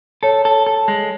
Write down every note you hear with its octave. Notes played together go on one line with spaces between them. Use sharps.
A4 C#5
A4
A4
G#3